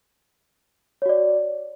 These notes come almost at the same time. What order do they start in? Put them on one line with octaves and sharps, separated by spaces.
C#5 F#4 D5